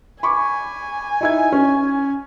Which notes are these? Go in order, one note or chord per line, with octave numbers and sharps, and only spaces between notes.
G#5 B5 C#6 D6
D#4 E4 G#6
C#4